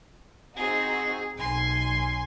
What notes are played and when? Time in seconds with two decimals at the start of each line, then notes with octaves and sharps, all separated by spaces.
0.56 C4 D#4 F#4 G#4
1.38 B1 G#5 C6